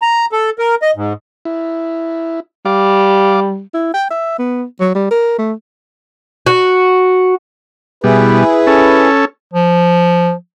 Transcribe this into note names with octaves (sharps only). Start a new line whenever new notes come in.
A#5
A4
A#4
D#5
G#2
E4
G3 F5 D6
E4
G5
E5
B3
F#3
G3
A#4
A3
F#4
B2 G3 E4 G#4 B4
C#4 A4
F3